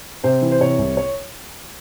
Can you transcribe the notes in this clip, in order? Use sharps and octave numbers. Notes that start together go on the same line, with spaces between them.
C3 C5
E3
C5
C3 C#5
C2
C#5